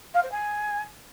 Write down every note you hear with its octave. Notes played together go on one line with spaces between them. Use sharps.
F5
C5
G#5